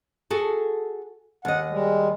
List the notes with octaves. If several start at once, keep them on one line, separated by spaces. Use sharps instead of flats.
F#4 G#4 A4
D#2 D#5 F#5
G3 G#3